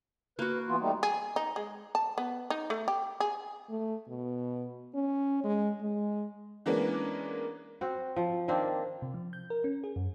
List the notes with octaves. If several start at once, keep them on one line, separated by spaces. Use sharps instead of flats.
A#3 F#4 B4
E3 B3 F4
G3 A3 D#4
G#4
D#4
G#3
A5
B3
D#4
A3
G4
G#4
A3
B2
C#4
G#3
G#3
E3 G#3 A#3 B3 C#4 D4
C4 F#4
F3
D#3 A#3 C4 D4
C3
F3
G6
A#4
C#4
G#4
F#2